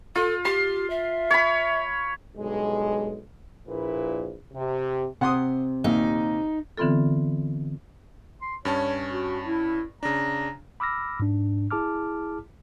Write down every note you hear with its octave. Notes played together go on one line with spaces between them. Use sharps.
F4 A4
G4 C6
E5
C#5 B5
B1 G2 G#3
A#1 A#2 E4 B4
C3
C3 F#5 C6 D#6
D#2 A#2 D#4
D3 E3 B3 C4 F4 A4
C6
G2 C#4 C#5 A5
F#4
E4
C#3 D4 A#5
B5 D6 E6 F6 A#6
G#2 D4
E4 G#4 A5 D6 F6